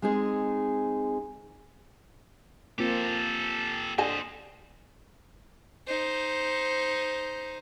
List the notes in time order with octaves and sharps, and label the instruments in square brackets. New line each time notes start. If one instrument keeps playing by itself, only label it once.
[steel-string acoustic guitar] G#3 C4 D#4 G#4
[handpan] A#3 C4 F4 [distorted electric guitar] G4 A4
[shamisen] D3 G#5 A5 [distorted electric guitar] C5 D#5
[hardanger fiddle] D#4 C5